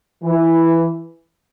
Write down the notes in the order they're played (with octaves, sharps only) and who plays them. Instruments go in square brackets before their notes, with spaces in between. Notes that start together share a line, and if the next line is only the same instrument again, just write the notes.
[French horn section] E3